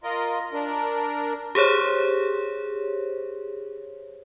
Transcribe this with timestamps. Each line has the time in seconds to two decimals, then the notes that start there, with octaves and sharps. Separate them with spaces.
0.03 F4 A#4 D#5
0.53 D4 A#4
1.55 G4 G#4 C5 C#5